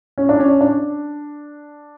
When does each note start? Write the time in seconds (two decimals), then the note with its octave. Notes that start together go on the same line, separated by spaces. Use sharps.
0.18 C#4
0.29 D4
0.40 C#4
0.61 D4